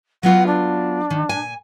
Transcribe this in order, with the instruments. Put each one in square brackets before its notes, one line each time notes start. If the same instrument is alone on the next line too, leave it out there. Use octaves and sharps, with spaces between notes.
[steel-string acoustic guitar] F#3 B3 F4 [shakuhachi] F#5
[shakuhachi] D4
[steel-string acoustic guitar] D#2 D#3
A#2 G#5